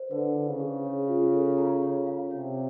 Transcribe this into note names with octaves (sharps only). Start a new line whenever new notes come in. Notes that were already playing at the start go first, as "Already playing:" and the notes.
Already playing: C5
D3 B4
E4
C#3
G#4
C#5
F4
A4
A#5
C#5
F5
C3 C#5